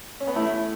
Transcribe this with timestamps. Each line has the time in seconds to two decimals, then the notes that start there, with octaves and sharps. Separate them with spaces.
0.20 C#4
0.27 B3
0.35 A3 E4